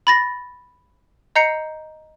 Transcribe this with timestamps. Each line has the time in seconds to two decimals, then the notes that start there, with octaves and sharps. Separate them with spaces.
0.07 B5 A6 A#6
1.36 D#5 A#5 G6 C7 C#7